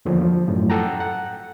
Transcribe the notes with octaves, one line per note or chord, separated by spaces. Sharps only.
E2 D3 F3 A#3
F3
F#2 A2
A4 F#5 G5 A#5
F#5